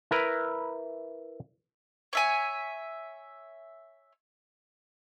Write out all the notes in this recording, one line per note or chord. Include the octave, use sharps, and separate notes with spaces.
E4 A#4 B4
C#5 E5 G#5